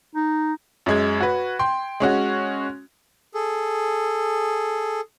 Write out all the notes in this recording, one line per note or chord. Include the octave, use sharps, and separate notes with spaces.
D#4
F#2 G#3 G#6
F#4 B4
G5 C6
G#3 C#4 F#4
G#4 A4